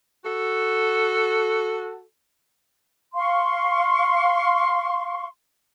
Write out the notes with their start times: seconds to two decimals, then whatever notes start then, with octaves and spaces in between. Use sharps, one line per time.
0.25 F#4 A4
3.15 F5 C6 C#6